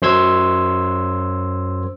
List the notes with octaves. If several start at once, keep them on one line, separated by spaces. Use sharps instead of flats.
F#2 C5 C6 E6 G#6